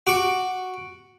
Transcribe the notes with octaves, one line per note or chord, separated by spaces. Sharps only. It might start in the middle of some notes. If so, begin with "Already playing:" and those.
F#4 D6